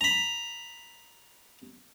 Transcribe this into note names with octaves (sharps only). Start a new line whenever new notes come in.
A#5 B5